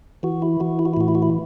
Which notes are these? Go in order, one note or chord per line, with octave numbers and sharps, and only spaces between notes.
E3 F#4
E4
E3 F#4
E4
F#4
E4
A2 F#4
E4
F#4
E4